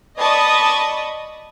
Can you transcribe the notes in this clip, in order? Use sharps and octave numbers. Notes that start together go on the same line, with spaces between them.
D5 D#5 A5 B5 C#6 D#6